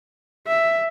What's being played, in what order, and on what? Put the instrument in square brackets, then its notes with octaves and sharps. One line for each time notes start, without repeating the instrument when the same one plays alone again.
[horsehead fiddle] E5